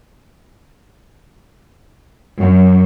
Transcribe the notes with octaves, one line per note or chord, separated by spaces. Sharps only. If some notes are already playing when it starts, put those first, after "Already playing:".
F#2